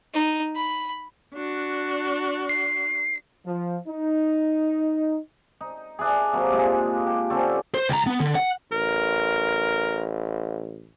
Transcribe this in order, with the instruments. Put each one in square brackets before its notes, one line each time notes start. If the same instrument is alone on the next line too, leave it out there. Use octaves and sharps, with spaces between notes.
[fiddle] D#4
B5
[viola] D4 F#4
[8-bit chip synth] C7
[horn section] F3
D#4
[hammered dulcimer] D#4
D4 E4 G#4
C3 F#3 A#3
A#2 G#3 F4
G4
D3 C4 C#4 A4
[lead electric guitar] C5
C#2 A#5
B3
D3
F#5
[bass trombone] A1 [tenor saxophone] A#4